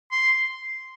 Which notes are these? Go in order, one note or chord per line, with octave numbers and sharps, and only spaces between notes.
C6